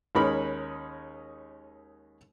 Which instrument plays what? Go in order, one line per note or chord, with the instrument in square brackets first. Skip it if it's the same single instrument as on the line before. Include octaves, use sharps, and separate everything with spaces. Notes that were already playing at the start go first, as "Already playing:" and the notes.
[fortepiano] D#2 G#3 C#4 D#4 A#4 B5